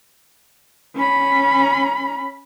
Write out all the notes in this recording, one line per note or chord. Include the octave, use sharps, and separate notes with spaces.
C#4 B5